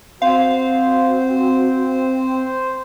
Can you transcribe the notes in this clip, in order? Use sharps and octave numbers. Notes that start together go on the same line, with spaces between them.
C4 F#4 C5 F5